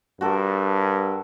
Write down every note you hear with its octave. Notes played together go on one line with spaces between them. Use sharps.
G2 F#4 A4 A#4